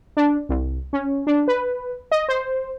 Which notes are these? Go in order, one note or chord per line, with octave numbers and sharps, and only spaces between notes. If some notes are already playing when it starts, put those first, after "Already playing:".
D4
C2
C#4
D4
B4
D#5
C5